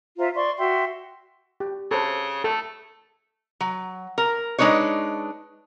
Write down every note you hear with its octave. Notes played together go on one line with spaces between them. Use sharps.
F4 C5 E5 A#5
D5 C6 C#6
F#4 E5 G5 C6
G4
C#3 A4 C5
A3 A4
F#3
A#4
G#3 D4 D#4 B4 C#5